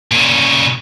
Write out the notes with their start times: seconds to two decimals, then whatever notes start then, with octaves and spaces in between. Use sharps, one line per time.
0.11 A#2 C#3